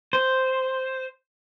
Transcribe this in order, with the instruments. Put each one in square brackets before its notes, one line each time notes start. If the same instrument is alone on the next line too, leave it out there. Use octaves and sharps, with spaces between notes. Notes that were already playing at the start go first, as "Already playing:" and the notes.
[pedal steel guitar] C5